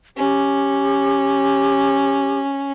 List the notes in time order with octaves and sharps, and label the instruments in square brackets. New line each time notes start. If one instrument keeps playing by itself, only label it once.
[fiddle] C#4 [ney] G4